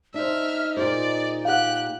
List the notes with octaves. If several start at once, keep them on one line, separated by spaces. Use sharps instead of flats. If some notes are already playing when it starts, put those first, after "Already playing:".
D4 D#4 C5 E5 F6
A#2 G#4 C5 D5
G4 F5 F#5 F#6